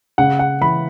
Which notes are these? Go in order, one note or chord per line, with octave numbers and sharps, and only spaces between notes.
C#3 F#5
F#5
E3 B5